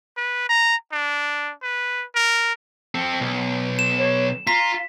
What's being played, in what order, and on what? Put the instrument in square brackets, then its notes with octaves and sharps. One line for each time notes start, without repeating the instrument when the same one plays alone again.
[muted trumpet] B4
A#5
D4
B4
A#4
[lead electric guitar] C4 A4
B1
[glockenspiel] E7
[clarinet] C#5
[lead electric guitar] F4 [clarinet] A#5 [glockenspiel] B6